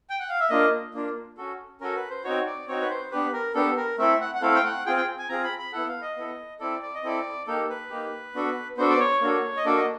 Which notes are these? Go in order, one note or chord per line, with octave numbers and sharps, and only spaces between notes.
G5
F#5
F5
E5
A#3 D4 F4 D#5
A#3 D4 F4
C#4 F#4 A4
C#4 F#4 A4 A#4
B4
C5
C4 D#4 F#4 C#5
D5
C4 D#4 F#4 C#5
B4
C5
B3 D4 G4 B4
A#4
B3 D4 G4 A4
A#4
A3 C4 E4 A4 E5
F#5
F#5
A3 C4 E4 A4 F5
G5
F#5
C4 F4 G#4 G5
G5
G#5
C4 F4 G#4 A#5
B5
B5
B3 E4 A4 F#5
F5
D#5
B3 E4 A4
C4 E4 A4 D5
D5
D#5
C4 E4 A4 D5
A#3 D#4 G4 A4
B4
A#3 D#4 G4
B3 D4 F#4 A4
B3 D4 F#4 A4 C5
D5
C#5
A#3 D4 F#4 A4
D#5
A#3 D4 F#4 A4 D5
D#5